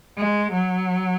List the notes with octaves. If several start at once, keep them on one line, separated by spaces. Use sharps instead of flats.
G#3
F#3